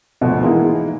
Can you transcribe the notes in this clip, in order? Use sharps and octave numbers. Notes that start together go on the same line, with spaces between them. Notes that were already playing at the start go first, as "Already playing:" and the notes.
D2 G#2 B2 F3
E3 G#3 A#3 B3 D#4 E4